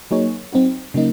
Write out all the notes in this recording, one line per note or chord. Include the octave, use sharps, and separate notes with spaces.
F#3 A#3 D#4 G#4 C#5
F#3 C4 D#4 F#4
C#3 F#3 A#3 D#4